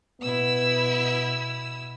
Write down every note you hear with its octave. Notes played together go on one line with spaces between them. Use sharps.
B2 B3 E4 E6